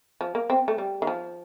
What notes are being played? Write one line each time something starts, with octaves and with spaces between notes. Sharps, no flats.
F3
A#3
C4
A3
G3
D#3
F3